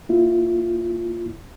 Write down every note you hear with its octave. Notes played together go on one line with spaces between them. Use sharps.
A#3 E4 F4